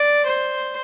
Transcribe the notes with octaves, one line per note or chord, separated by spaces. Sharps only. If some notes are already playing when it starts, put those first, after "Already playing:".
Already playing: D5
C5